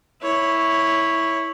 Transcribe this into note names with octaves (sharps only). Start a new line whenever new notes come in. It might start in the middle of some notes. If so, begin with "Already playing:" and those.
E4 C#5